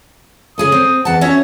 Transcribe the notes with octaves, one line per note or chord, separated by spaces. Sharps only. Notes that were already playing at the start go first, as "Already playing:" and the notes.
C#3 G#4 A4 D#6
C4
E2 F#5 A5
C#4 F#4 C#5 E5